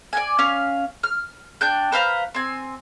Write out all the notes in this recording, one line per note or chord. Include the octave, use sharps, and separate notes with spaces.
D5 F#5 G#5
C#4 F5 G#5
F6
D4 G5 F#6 G6
B4 C5 F5 A#5
C4 G#5